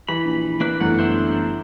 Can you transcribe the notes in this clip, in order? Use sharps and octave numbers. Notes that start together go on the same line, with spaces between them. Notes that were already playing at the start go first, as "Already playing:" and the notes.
E3 B5
A#1
A#3 D4 B4
G1 F#2 E3 A3 F#5
D4 E4 C5